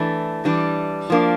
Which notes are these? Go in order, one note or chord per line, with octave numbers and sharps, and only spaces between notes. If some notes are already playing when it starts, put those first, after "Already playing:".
Already playing: E3 A3 D4
E3 G3 D4
F3 A#3 D4